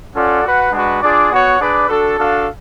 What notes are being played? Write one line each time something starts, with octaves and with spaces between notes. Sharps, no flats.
C#4 F4 A4 D5 F#5
F#4 B4 F#5
G#3 D4 F#4 B4 F#5
D4 F4 G#4 D5
B3 F#4 C#5 F#5
D4 G#4 B4 D5
D4 F#4 A4
D4 F#4 A4 F5